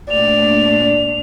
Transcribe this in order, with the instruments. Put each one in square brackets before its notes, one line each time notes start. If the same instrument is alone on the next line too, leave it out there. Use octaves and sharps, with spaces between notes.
[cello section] A#2 A3 D4 [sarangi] D5 [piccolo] F7